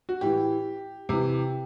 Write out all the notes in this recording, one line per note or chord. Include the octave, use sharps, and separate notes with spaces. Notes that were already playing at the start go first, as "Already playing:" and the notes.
F#4
A2 E3 G4
C3 E3